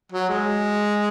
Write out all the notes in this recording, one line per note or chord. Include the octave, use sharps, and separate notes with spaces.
F#3
G#3